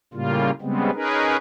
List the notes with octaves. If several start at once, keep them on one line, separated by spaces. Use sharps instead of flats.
A2 C#3 G3 A#3 F4
C#3 G3 G#3 B3 C4
C#4 D#4 G#4 A#4 B4